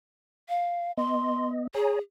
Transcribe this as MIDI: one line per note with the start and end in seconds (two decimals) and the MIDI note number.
0.49 0.92 77
0.98 1.67 59
0.98 1.67 75
0.98 1.46 84
1.75 1.98 68
1.75 1.99 73
1.75 1.99 80
1.75 1.99 82